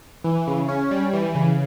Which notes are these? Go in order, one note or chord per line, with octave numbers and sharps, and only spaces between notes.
E3
C#3
C#4
G3
E3
C#3